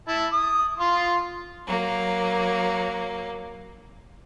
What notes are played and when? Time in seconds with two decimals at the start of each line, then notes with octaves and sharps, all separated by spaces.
0.08 E4 A5
0.32 D#6
0.80 F4 C6
1.66 F#3 A#3